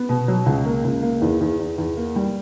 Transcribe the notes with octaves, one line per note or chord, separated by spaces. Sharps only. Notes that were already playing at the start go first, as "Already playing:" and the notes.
Already playing: B3
B2
F#3
C#2
A#3
C#2
A#3
E2
E2
E2
E2
A#3
G3